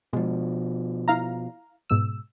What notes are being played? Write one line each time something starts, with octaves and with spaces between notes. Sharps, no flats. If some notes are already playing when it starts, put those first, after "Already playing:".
B2 F3 G#3
E4 F5 A#5
G#2 B2 E6